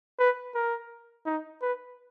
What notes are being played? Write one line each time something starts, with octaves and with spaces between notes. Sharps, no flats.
B4
A#4
D#4
B4